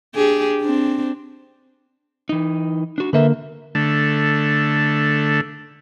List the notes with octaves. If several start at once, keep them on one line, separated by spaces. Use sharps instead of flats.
D4 G4 G#4
C4 D4
E3 D#4
D4 F#4
D3 A#3 A#4 B4 E5
D3 A3